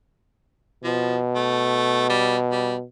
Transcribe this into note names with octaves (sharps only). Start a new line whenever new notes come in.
B2 F3
A3
G3
G3